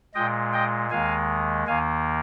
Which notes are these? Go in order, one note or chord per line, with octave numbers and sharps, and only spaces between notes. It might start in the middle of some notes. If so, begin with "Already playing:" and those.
A#2 G#3 D#5 G5
D#5 G5
D#2 D#3 G#3 F5 G#5
D#2 D#3 A#3 F5 G#5